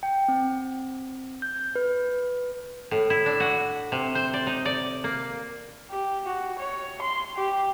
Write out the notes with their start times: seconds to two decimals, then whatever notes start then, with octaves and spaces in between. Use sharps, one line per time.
0.03 G5
0.28 C4
1.42 G6
1.75 B4
2.91 A2
3.10 E4
3.26 D4
3.40 F#4
3.92 C3
4.15 C5
4.34 D5
4.47 D#4
4.65 D5
5.04 A#3
5.91 G4
6.26 F#4
6.60 C#5
7.02 C6
7.37 G4